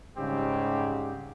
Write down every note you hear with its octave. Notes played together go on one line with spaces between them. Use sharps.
G#2 C#3 G3 G#3 C4 G4